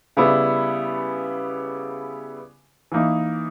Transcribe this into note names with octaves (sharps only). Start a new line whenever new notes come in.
C#3 G3 B3 E4
E3 A#3 D#4